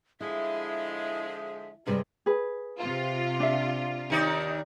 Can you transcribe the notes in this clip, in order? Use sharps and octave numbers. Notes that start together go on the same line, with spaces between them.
D3 F3 G#3 E4 E5
G2 C3 G3 G#3
G#4 B4
C3 F4
D4 E5
D#2 D#4 D5